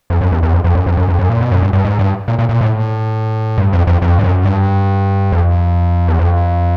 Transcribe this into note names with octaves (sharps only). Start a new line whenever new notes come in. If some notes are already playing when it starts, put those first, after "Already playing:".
F2
F#2
E2
E2
F2
F2
F#2
F2
F#2
F2
F#2
A#2
B2
F#2
G2
G2
G#2
G2
A#2
A#2
A#2
A2
G2
F2
F2
F2
G2
F#2
G2
F2
E2
F2